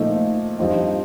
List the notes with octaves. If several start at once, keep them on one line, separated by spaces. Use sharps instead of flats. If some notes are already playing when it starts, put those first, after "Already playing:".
Already playing: A#2 F3 A3 D#4
G2 F3 C4 D#4